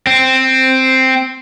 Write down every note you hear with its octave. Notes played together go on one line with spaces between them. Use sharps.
C4